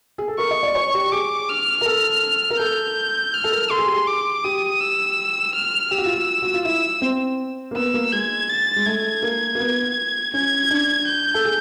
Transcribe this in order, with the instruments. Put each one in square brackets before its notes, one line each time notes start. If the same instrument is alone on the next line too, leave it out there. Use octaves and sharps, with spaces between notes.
[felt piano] G#4
A4
[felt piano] A#4 [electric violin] C#6
[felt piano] D#5
D5
C#5
G4
[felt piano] G#4 [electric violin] D6
[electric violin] F6
[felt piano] A#4
A4
A#4
[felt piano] A4 [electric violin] G6
[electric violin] F6
[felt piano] A4
A#4
[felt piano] A4 [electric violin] C6
[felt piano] G#4
G4
G#4
[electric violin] D6
[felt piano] G4 [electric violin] D#6
[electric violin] E6
F6
[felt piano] G4 [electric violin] E6
[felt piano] F#4
F4
F#4
F#4
F4
[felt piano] E4 [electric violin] E6
[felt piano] C4
A#3
[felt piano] B3 [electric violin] E6
[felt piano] A#3
[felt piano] G#3 [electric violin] G#6
[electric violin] A6
[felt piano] G#3
[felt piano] A3 [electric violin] G#6
[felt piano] A#3
A#3
B3
[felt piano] C#4 [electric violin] G#6
[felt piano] D4
[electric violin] G6
[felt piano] A4
G#4